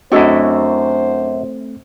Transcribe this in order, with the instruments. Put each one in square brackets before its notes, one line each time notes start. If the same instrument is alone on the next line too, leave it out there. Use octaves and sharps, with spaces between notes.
[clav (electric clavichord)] F#2 E4 [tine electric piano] A3 C4 [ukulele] D4 F#4 D#5 [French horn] C5